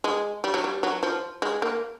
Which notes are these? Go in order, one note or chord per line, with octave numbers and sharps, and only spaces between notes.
G#3
G3
F#3
G3
F#3
F3
G#3
A#3